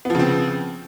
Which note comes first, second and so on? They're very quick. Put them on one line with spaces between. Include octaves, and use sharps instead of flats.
B3 F3 C#3 C4